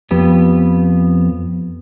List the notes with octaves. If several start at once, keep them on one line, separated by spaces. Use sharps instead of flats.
F2 B3 G4